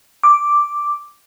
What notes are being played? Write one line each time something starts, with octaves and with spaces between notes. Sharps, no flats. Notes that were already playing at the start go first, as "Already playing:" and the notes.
D6